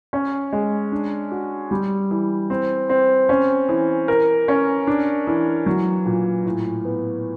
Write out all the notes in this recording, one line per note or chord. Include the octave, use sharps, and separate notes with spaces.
C#4
G#3
D4
F#4
G3
E3
C4
C4
C#4
E3
A#4
C#4
D4
E3
F#3
A#2
A2
B3